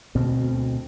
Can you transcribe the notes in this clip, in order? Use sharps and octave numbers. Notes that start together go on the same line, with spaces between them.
D2 B2 C4